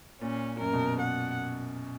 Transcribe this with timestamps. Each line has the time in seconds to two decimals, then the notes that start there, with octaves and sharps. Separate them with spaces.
0.21 A#2 C#4
0.60 F#2 A#4
0.73 B2
1.01 F#5